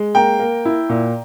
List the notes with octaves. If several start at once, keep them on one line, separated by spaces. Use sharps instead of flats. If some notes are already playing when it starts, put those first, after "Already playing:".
Already playing: G#3
A#3 G5 A#5
A#3
E4
A#2